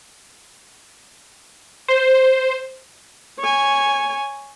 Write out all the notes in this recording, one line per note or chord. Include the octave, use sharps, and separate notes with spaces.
C5
C#5 G#5